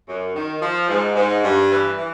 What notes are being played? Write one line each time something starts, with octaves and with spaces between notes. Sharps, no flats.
F#2
D#3
F3
G#2
G#2
G2
E3
E3